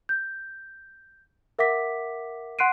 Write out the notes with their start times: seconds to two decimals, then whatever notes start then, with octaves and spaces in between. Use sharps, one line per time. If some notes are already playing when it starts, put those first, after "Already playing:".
0.09 G6
1.59 A#4 E5 F#5 D6 B6
2.59 F#5 C6 F#6 C7 D7 D#7